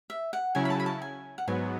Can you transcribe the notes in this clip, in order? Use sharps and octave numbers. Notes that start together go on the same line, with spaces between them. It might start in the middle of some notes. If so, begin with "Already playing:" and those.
E5
F#5
C#3 F#3 C#4 E4 G#5
B5
A5
B5
A5
G#5
F#5
G#2 F#3 B3 G#5